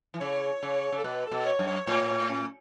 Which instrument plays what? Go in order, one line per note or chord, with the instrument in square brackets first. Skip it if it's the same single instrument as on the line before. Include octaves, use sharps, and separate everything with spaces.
[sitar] E3
[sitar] C#3 [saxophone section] C#5
[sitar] C#3
C#3
[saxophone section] A4
[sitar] B2 [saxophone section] B4
[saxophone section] A4
[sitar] B2
[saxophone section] C#5
[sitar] F#2
[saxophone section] C#5
[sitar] A2 [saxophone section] C#5
[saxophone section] C#5
C#4